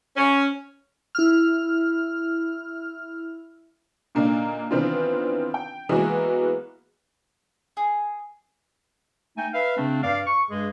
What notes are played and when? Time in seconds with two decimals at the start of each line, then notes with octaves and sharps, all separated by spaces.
0.16 C#4
1.15 E4 F6
4.15 A#2 D3 A#3 D4 D#4
4.71 D#3 E3 B3 C4 D4 F4
5.54 G5
5.89 E3 G#3 A#3 B3 F#4 G#4
7.77 G#4
9.36 A3 D#4 G5 G#5
9.54 B4 E5 F5
9.77 C#3 A3 C4 D4
10.03 G2 D5 F5
10.26 C#6
10.50 G2 G#3 G#4